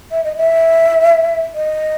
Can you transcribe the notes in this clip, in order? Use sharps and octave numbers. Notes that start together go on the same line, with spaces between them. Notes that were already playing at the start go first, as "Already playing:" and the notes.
E5
D#5
E5
D#5